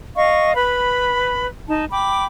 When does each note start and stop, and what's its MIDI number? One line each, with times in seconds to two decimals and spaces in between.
0.16 0.53 75
0.16 0.53 77
0.16 0.53 85
0.54 1.48 71
0.54 1.48 83
1.67 1.85 63
1.67 1.85 81
1.91 2.24 79
1.91 2.24 83
1.91 2.24 86